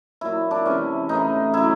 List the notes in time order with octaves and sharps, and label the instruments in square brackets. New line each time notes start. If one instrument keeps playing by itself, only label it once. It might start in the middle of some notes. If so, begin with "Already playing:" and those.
[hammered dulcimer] A#2 F#3 E4
D4
C3 E3 G#3 C#4
A2 E3 G#3 D#4
C#3 F#3 E4